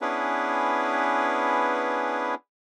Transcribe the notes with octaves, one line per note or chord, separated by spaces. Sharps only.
B3 C#4 D4 E4 G#4 B4